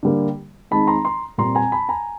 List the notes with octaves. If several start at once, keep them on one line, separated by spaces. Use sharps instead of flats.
D3 G3 A#3
D#3 G#3 C4 D#4 A5 B5
A#5 C6
A#5 C6
A#2 G3 C4 A#5 C6
G#5 A#5
A5 B5
G#5 A#5